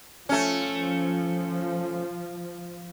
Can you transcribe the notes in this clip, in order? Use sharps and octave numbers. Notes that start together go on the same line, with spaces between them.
F3 A3 C#4